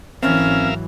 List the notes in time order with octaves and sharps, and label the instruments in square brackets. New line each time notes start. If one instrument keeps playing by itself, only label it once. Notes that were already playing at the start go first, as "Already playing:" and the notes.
[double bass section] G#1 E3 F#3 [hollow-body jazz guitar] C4 [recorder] C#4 [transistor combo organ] A#4 E5 F5